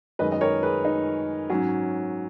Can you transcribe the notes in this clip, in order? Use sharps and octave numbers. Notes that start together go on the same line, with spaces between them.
F#2 D#3 G#3 B4 D#5
D#5
A#4 C#5
G#4 B4
D#4
G#2 F#3 C#4